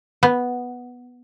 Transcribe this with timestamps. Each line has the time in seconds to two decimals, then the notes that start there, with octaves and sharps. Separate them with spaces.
0.23 B3